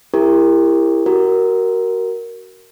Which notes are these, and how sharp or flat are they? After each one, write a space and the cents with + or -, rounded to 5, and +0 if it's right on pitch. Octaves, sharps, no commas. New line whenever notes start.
E4 +15 G4 +35 A#4 +0
F#4 +25 A#4 +0